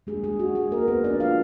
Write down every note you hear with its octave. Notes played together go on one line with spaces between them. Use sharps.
D#3 G#3 A#3 D4 G#4
G#3 G#4
F#4
G#3 G#4
A#3 A#4
B3 B4
F3 A#3 D4 D5
F4 F5